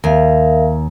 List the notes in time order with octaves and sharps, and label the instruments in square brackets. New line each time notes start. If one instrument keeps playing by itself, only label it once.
[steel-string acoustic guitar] D#2 [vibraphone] A#4 E5 F5